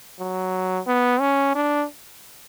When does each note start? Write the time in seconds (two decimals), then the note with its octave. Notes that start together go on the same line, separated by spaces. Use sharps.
0.19 F#3
0.87 B3
1.20 C#4
1.55 D4